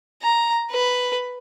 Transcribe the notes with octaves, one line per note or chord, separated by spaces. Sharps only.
A#5
B4